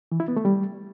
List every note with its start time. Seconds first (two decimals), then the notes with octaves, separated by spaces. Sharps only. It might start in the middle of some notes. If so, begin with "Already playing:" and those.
0.12 E3
0.20 E4
0.28 B3
0.36 A3
0.45 G3